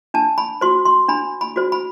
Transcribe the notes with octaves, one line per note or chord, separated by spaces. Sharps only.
D4 A5
B5
F#4 C5 C6
C6
D4 B5
B5
F#4 C5
B5